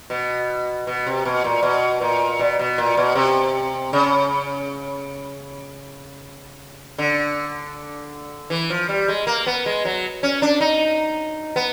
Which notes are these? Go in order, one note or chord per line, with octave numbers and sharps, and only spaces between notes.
B2
B2
C3
B2
A#2
B2
A#2
B2
B2
A#2
B2
C3
C#3
D3
E3
F3
G3
G#3
A#3
B3
G#3
F#3
C#4
D4
D#4
B3